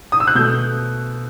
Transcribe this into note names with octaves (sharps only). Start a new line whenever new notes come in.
D#6
E6
F#6
B2 A3 G6